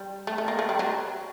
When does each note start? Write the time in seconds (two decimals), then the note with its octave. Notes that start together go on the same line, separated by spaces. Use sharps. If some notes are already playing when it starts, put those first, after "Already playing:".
Already playing: G3
0.27 A3
0.38 A3
0.48 A#3
0.59 A3
0.69 G3
0.79 F#3